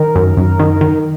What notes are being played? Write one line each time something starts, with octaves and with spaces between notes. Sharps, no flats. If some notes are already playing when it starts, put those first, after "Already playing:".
Already playing: D#3 A#4
F#2
F#2
D#3
D#3